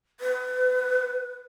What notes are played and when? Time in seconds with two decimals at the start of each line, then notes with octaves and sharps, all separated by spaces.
0.20 B4